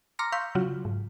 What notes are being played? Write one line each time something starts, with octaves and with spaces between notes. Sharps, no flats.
A#5 C6 D6 F6 A#6 C#7
F5 C6 C#6 E6 G6 B6
C#3 F#3 F4 F#4
G#2